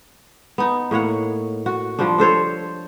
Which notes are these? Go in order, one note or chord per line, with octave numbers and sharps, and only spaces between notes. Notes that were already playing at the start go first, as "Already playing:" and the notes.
B3 D#4
A2 A#3 C#5 F#5
F#4
F3 G3 C4 D4
D4 A4 C5 C#5